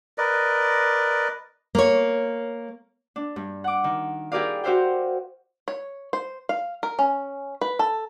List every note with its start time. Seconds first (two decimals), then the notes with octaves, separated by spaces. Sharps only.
0.18 A#4 B4 D5 D#5
1.75 A#3 C#5
3.16 D4
3.36 G2
3.64 F#5 D6
3.84 D#3
4.32 E4 G4 G#4 A#4 D5 F5
4.64 F#4 G4 C5 E5 F5 G5
5.68 C#5
6.13 C5
6.49 F5
6.83 A#4
6.99 C#4
7.61 B4
7.79 A4